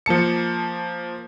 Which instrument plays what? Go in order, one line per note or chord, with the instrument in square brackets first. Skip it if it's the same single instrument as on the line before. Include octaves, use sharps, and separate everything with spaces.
[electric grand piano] F3 A#3 A5 C#7